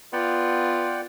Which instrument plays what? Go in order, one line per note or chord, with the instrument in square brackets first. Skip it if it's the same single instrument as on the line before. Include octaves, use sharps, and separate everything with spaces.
[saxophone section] B3 F4 [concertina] D5 F#5 G5